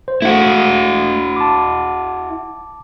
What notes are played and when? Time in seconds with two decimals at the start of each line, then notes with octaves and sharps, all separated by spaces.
0.08 C5
0.22 A3 E4 F#4
1.36 A5 D6